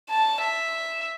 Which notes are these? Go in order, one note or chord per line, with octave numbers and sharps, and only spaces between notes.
A5
E5